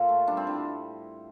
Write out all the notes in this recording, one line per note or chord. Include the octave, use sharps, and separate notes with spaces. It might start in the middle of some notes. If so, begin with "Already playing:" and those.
Already playing: A#2 F4 A4 C5 D5
A3
G3 D4
C4
A2 D4